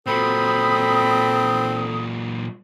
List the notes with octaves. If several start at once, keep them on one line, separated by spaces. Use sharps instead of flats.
A#2 F#3 C4 A4 B5 D#6